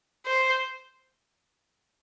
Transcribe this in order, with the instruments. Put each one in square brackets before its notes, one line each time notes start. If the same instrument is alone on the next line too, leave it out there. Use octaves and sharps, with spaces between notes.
[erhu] C5